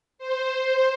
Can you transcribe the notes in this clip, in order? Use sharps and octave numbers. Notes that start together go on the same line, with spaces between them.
C5